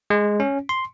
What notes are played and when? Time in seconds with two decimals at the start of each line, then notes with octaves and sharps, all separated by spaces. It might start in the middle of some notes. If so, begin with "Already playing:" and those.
0.10 G#3
0.40 C#4
0.69 C6